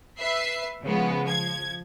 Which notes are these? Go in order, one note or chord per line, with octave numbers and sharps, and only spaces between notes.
B4 E5 C7
C#3 F3 G#3 B3
F3 G#6